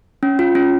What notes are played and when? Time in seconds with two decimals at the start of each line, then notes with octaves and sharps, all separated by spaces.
0.23 C#4
0.39 F4
0.55 C#4